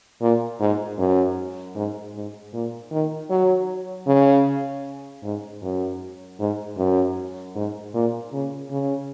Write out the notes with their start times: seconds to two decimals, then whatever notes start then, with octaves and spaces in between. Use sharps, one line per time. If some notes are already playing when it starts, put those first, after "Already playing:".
0.21 A#2
0.60 G#2
0.98 F#2
1.75 G#2
2.15 G#2
2.53 A#2
2.92 D#3
3.30 F#3
4.07 C#3
5.24 G#2
5.63 F#2
6.39 G#2
6.78 F#2
7.56 G#2
7.94 A#2
8.33 C#3
8.71 C#3